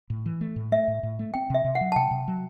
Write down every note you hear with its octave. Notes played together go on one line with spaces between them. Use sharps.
A2
E3
A3
A2
A3 E5
A2
A2
A3
C4 G5
C3 E5
C3
F#5
F#3
A5
C3 G5
C3
F#3